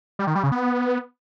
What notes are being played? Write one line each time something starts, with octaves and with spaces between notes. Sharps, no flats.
G3
D#3
G3
C#3
B3